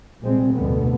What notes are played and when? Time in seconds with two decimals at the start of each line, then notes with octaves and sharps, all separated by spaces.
0.21 C2 A#2 G3 G#3 C4
0.55 F1 D2 G2 B2 D3 B3